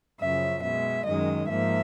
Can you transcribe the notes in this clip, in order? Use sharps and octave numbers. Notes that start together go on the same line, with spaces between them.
F#2 C#3 F3 E5
B2 G#3 E5
F#2 D#3 G#3 D#5
G#2 F3 A#3 E5